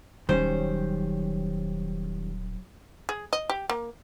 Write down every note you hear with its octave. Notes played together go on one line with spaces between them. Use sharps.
D#1 D#3 F#3 G3 C#4 C5
G#4
D#5
G4
A#3